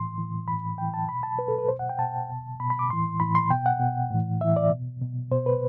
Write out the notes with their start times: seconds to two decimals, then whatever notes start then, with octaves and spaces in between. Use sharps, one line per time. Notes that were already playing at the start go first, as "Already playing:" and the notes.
Already playing: A2 E3 C6
0.18 A2 E3
0.48 A2 E3 B5
0.78 A2 E3 G5
0.94 A5
1.09 B2 B5
1.23 A5
1.38 B2 B4
1.48 A4
1.58 B4
1.68 B2 C5
1.79 F#5
1.89 G5
1.99 B2 A5
2.30 B2
2.60 B2 B5
2.70 B5
2.79 D6
2.89 A2 E3 C6
3.20 A2 E3 B5
3.35 C6
3.50 B2 G5
3.66 F#5
3.80 B2
4.10 A2 E3
4.41 A2 E3 E5
4.56 D5
4.70 B2
5.02 B2
5.32 B2 C5
5.46 B4